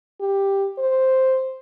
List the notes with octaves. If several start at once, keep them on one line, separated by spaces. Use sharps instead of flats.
G4
C5